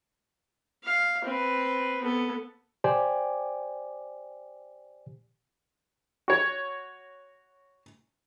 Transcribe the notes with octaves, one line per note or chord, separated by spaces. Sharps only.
F5
C4 B4
B3 A4
G4 C5 D5 G5 G#5
F#4 C#5